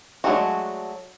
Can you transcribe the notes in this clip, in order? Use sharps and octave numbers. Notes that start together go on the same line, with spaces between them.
F#3 G#3 A3 D4 F#4